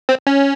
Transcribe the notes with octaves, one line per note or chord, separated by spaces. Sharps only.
C4
C#4